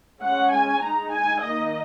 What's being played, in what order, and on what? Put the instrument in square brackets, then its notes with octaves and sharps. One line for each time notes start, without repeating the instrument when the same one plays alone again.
[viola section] G#3 C#4 F#5
G#5
G#3 D#4 A#5
G#5
D#3 A#3 D#4 D#5